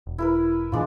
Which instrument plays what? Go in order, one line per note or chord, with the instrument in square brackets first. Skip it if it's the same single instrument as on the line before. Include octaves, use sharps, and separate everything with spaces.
[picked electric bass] E1
[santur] E4 A#4 B4
[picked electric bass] G2 A#2 E3 [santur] G#3 D4 F4